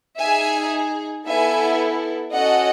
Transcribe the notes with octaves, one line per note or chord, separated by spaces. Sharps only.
D#4 G#4 E5 G#5
B3 E4 A4 E5 G#5
C#4 F#4 A4 D#5 F#5